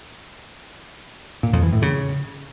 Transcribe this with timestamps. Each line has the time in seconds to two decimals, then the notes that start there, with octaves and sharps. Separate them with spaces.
1.43 A#2
1.53 F2
1.63 E3
1.72 A2
1.82 C#3